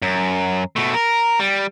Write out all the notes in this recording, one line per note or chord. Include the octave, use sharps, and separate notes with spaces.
F#2
B2 A3
A#4
G3